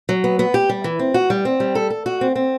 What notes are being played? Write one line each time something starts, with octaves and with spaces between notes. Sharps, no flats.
F#3
B3
B3
G4
G3
E3
C4
F#4
G3
C4
G3
A4
A4
F#4
C4
C4